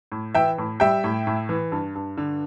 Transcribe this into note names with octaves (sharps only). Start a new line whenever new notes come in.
A2
E3 E5 G5
A2
G3 E5 G5
A2
A2
E3
G2
G2
D3